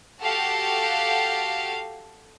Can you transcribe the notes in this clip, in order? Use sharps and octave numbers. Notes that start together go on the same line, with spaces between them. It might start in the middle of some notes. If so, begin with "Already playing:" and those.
F#4 G4 A4 F5 F#5